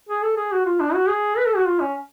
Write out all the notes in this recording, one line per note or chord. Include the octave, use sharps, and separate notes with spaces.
G#4
A4
G#4
F#4
F4
D4
F#4
G#4
B4
A4
F#4
F4
C#4